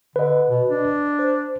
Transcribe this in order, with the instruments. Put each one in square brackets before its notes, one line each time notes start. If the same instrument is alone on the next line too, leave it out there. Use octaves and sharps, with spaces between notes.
[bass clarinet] D3 [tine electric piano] B4 D#5
[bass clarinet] B2
D4
[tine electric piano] C5